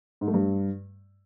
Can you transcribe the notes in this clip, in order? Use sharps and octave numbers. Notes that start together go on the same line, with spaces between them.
G#2
A3
G2